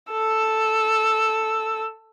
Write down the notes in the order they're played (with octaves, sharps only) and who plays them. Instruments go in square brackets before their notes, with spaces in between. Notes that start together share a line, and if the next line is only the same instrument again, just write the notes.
[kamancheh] A4 E6